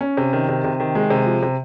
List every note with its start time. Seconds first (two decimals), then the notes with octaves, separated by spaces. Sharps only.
0.01 C#4
0.17 C3
0.33 D#3
0.49 C3
0.64 C3
0.80 D#3
0.95 G#3
1.10 C3
1.26 F3
1.42 C3